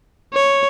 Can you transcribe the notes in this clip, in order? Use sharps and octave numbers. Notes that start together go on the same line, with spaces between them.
C#5